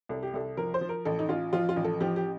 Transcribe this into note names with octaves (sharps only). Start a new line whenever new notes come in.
C2 A4
G4
C2 A4
F3 A#4
C5
F3
A#4
A1 A4
D#4
A1 F4
F3 F4
F4
A1
A4
F3 G4
G4